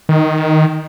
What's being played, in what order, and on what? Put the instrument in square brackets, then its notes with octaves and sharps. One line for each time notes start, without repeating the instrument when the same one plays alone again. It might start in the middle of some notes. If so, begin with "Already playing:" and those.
[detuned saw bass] D#3